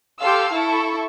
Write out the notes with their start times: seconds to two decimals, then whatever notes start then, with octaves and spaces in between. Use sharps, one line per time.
0.19 G4 A4 F5 C6 E6
0.52 E4 A4 C#6